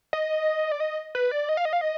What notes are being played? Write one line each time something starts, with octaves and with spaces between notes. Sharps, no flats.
D#5
D5
D#5
B4
D5
D#5
F5
D#5
F5
D#5